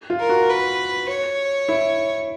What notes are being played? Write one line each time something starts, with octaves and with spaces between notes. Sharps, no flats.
F4
A#4
F#4
B4
C#5
E4